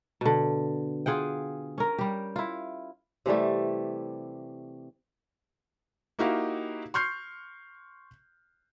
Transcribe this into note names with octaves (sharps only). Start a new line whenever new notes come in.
B2 D3
F4 G#4 F#5 G5
C#4 A#4
G3 G4
E4 F4
C3 E3 G3 A3
A#3 D#4 E4 F#4 G4 F5
C6 C#6 F6 G6 C7